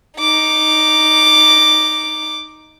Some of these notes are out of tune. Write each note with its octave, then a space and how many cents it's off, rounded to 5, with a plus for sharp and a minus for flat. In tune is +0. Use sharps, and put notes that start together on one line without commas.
D#4 +0 D6 +0